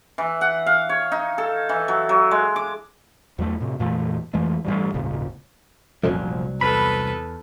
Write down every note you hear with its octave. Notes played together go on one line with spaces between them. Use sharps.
E3
F#5
F5
C#5
D#4
A4
E3
F#3
F#3
G#3
D6
E2 F#3 A3
A2 C3
F2 A#2 E3 A3
F2 E3 G#3 A3
A1 G2 F3 G3
D#1 G#1 A#2 C#3
F1 C2 F#2 A#2 F3 F#3
E2 A4 B4 B5